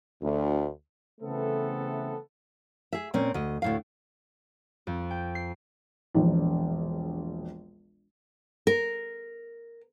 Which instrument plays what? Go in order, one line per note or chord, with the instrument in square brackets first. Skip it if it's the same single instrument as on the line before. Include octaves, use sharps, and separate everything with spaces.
[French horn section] D2
[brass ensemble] C#3 E3 A3 B3 C4 A4
[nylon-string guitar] G#4 E5
A#2 C4 C#4
D2 D#5
D2 A2 F5
[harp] F2
G5
C7
[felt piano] E1 A#1
[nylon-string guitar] A#4